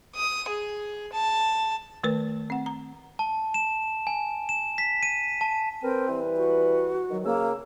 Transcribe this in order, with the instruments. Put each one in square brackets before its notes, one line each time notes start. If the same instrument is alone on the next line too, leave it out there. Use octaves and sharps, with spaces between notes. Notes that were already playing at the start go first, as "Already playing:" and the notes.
[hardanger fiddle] D#6
G#4
A5
[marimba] D#3 A3 A#4 B4
C4 F#5
A#5
[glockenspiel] A5
E7
G#5
E7
B6
D#7
A5
[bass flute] C4 [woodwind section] A#4 B4 G5
[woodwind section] E3 G3 B4
[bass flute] F#4
[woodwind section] D#3 F#3
[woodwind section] C#3 E6 [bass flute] A#3